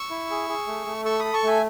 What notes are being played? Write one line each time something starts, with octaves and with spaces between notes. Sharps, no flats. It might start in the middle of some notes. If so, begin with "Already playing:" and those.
Already playing: C#6 E6
E4
G#4
G#4
A3
A3
A4 C#6 E6
A4 B5 D#6
A5 C#6
A3 E5 G#5